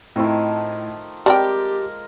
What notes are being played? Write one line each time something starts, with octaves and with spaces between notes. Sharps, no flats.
A2 D#3 F3 A3 C4 E4
G3 G#3 C4 G4 A#4 G5 A5 D6